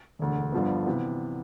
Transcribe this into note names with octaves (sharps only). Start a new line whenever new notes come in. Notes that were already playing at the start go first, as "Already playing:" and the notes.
E1 D2 D3
G1 G2 D3 F3 B3
C3 E3 B3